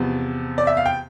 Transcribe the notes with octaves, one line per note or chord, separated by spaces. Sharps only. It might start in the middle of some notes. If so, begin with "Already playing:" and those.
Already playing: E2 C3 F3 B3
D5
E5
F5
G5